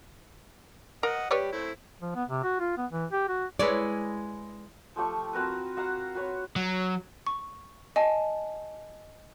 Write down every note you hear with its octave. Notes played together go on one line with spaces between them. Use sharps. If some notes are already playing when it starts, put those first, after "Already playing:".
A#4 D#5 F#5
G3 G4 B4 C#5 D5
A3 C4 E4
F3
B3
C3
F#4
F4
B3
E3
G4
F#4
G#3 E4 B4 C#5 D5
F3 A3 G4 C#6
C4 F#4 A#4 B4
F#4 F5 F#5 A#5
F#4 B4 C#5
F#3
C#6
D#5 G#5 A5